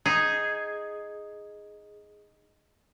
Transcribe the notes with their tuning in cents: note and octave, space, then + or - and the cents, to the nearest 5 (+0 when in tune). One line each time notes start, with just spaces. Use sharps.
D#4 +0 G#4 +0